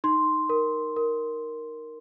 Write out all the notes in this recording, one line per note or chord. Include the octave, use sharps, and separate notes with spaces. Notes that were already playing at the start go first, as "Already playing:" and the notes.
D#4 C6
A#4
A#4